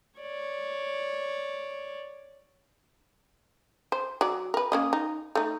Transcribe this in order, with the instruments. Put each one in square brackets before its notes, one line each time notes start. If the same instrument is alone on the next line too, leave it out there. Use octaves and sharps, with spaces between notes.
[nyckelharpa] C#5 D5
[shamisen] C5
F#3 D5
A#4 B4
A#3 C#4 D#5
D#4
A3 D#4